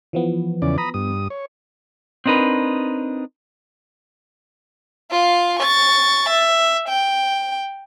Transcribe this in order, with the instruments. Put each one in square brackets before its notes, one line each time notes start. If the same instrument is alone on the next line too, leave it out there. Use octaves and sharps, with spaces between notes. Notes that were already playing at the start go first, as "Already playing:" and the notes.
[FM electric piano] E3 F3 B3
[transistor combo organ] E2 C#3 D5
A#5 B5 D#6
G2 D#6
C#5
[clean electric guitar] C4 D4 D#4 A#4 B4
[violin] F4 F5
C#6 A6
E5
G5